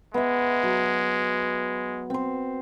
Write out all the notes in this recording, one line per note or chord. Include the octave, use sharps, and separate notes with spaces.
G#3 B3 E5
F#3
C4 C5